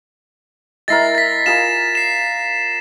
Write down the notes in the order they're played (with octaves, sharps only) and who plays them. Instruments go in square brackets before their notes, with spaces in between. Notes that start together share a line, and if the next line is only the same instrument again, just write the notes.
[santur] G#3 E4 A#4 [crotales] A6 A#6 C7
[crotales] A6 B6
[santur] F4 G#4 A#4 [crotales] E7
[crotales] C7 E7